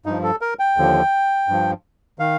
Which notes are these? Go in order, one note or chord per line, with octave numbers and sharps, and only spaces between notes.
G2 F3 D#4
A4
A#4
G5
D#2 D3 F3
G2 F3
D#3 F5